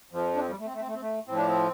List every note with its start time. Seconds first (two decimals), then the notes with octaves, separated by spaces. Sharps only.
0.11 F2 F3
0.35 D4
0.40 C4
0.49 G3
0.59 A3
0.66 C4
0.74 A3
0.81 C4
0.87 A3
0.94 C4
1.02 A3
1.27 A2 F3 C4
1.37 D4
1.47 C4